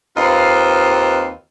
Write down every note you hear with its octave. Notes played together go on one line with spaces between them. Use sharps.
D#2 C4 F4 B4 D#5